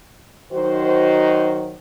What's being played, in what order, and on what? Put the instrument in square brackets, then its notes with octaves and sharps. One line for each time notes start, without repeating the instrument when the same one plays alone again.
[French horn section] D#3 F#3 D#4 F#4 C5